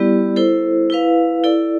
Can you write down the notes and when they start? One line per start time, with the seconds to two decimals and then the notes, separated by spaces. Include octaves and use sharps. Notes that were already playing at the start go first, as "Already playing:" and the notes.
Already playing: G3 B3 E4 G4 D5
0.36 E4 A4 C5
0.90 E4 B4 F5
1.44 E4 A4 D5